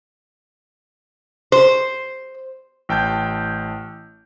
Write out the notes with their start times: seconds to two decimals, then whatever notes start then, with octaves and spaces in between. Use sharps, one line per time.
1.52 C5
2.89 A1 G5 A5 G6